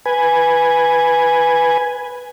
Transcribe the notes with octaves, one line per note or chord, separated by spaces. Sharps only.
B4 G#5